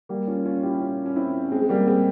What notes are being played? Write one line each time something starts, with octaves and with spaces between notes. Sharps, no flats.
G3 A#3
C#4 F4
C#4 F4
E4 G4
C#4 F4
C#4
C4 E4
C#4
G#3 C4
G#3
G3 A#3
G#3 C4